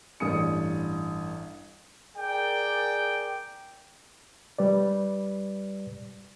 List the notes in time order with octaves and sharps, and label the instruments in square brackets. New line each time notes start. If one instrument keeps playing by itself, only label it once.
[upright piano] A1 G2 D#6 C#7
[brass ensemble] G#4 A#4 D5 G5
[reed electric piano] G3 B4 D5